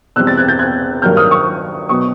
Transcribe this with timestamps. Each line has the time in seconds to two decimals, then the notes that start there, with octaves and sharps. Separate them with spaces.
0.16 E2 B2 G3 C4 E6 F#6
0.27 A6
0.37 F#6 G#6
0.48 G6 A6
0.59 F#6 G#6
1.02 G2 D#3 F#3 A#3 F6 G6
1.17 D#6 F6
1.31 C#6 D#6
1.89 B2 F#3 B3 C#6 D#6